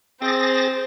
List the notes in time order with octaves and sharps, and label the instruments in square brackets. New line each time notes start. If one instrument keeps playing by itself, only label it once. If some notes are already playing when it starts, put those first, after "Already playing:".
[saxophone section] C4 [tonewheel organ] G#4 A6 A#6 [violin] C5